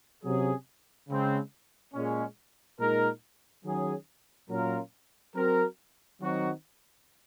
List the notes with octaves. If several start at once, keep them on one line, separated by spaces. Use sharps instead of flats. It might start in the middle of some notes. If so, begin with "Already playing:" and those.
C3 F#3 C#4 G#4
C#3 G#3 C4
A#2 G#3 C#4
A#2 G#3 D#4 A#4
D#3 F#3 C#4 G#4
A#2 F#3 C#4 F4 A#4
F#3 C4 F#4 A#4
D#3 F#3 C4 D#4 F#4